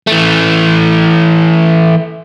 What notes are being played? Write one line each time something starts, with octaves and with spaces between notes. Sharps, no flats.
E3 A3